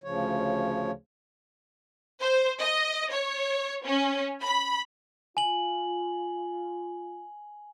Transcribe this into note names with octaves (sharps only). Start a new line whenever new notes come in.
D2 C#3 F3 C#5
C5
D#5
C#5
C#4
B5
F4 G#5 F#7